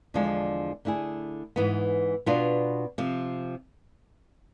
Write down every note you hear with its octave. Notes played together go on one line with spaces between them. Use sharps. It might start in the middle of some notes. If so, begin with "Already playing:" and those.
E2 D3 F3 G#3 D4
D3 A3 E4 G#4
G#2 E3 B3
B2 B3 D4 F4
C3 F3